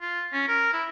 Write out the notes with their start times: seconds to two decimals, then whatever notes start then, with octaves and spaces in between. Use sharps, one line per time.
0.01 F4
0.33 C#4
0.48 A#4
0.73 E4